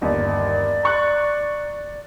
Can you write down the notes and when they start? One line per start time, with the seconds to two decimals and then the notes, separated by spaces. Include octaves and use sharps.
0.01 G1 D#2 D5
0.83 A#5 C#6 F#6